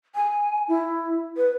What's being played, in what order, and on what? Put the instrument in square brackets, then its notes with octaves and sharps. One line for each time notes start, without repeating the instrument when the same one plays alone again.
[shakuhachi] G#5
E4
B4